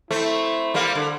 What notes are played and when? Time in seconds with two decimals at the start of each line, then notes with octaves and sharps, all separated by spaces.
0.11 A3 C4 E4
0.74 G3 A#3
0.95 D3